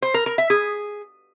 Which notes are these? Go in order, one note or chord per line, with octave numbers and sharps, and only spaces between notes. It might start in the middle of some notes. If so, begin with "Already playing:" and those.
C5
A#4
A#4
E5
G#4